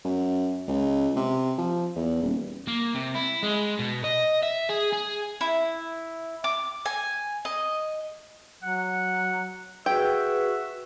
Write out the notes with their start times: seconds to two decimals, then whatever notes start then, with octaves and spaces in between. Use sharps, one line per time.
0.04 F#2
0.68 C#2
1.16 C3
1.58 F3
1.96 E2
2.22 D#1
2.67 A#3
2.95 C3
3.15 E4
3.43 G#3
3.79 B2
4.05 D#5
4.43 E5
4.70 G#4
4.93 G#4
5.41 E4
6.44 D6
6.85 G#5
7.45 D#5
8.63 F#3 F#5
9.86 F#4 G#4 B4 E5 G5